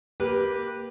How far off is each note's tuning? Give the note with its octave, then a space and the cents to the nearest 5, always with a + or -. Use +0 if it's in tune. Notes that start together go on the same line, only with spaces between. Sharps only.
A#3 +0 G4 +0 B4 -15